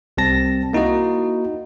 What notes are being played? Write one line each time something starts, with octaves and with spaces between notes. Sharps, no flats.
C2 G3 C4 A5 A#6
A#3 D#4 E4 F#4 D#5